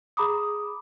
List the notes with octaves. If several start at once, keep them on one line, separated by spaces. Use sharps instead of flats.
G#4 A#5 B5 D6 D#6